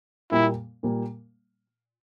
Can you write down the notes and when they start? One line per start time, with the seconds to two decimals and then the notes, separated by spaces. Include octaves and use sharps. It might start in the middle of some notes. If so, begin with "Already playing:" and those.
0.31 A#2 G3 A#3 E4
0.83 A#2 G3 A#3